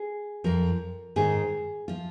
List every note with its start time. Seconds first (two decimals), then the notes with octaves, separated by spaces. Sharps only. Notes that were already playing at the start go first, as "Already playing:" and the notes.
Already playing: G#4
0.44 F2 F3 A#4
1.16 G#2 D#3 G#4
1.88 F3 F4